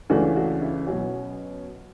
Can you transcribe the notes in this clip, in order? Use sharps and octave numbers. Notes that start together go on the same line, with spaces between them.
C#2 C#3 E3 A3 D4 F#4
F#4
E4
B2 F#3 C#4 F#4